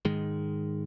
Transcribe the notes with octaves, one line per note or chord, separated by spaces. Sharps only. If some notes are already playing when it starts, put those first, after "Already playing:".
G#2 D#3 G#3